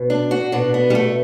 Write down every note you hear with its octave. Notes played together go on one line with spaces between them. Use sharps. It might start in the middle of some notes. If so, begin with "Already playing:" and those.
Already playing: B2
D4
F#4
B2 D4
B3
G3
A3